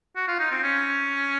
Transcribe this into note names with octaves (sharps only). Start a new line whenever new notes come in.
F#4
F4
D#4
C4
C#4